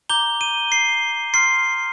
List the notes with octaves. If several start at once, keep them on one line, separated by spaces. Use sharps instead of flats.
A#5 D6 G6 G7
D#7
C7
C6 F6 C7